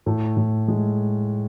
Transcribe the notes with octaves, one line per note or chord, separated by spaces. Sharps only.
A2 A3
A2
G#3